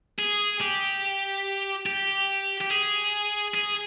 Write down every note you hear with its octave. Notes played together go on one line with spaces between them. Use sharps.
G#4
G4
G4
G4
G#4
G#4